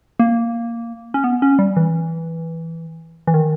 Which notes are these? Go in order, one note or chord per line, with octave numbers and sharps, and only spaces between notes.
A#3
C#4
B3
C#4
G3
E3
E3
D#3